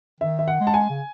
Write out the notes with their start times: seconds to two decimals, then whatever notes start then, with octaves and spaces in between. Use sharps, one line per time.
0.21 D#3 E5
0.39 E5
0.48 F#5
0.60 G#3
0.67 A5
0.74 G#5
0.90 C#3